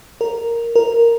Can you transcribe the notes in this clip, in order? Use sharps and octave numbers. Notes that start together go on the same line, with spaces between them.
A#4
A#4